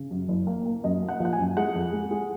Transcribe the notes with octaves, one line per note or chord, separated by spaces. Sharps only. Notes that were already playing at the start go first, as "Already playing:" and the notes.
Already playing: C#3
F#2
F#1
A#3
A#3
F#2 D#5
A#3
F#5
F3 F#5
G#5
F#2
G#3 F#5
F2
G#3
G#3